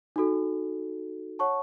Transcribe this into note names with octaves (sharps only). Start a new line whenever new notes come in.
D#4 F#4 A4
C#5 F#5 A5 C#6